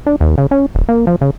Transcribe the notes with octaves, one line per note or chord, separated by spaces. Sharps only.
D4
D#2
C#3
C#4
D1
A#3
F3
C#3